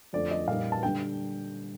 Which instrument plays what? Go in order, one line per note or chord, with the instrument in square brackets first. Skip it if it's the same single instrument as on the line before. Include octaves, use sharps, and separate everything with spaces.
[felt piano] F2 D3 F3 A3 [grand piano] D5
[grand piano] D#5
[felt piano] A#2 G3 A#3 D#4 [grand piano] F5
[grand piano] A5
[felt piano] D3 G3 [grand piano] G5